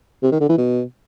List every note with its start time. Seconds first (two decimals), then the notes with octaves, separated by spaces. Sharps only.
0.23 C3
0.32 D#3
0.40 D3
0.49 E3
0.58 B2